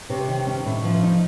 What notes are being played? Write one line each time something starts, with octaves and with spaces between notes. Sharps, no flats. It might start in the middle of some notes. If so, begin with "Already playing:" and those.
C3 C#5
D#3
C#4
A2
F3
D#4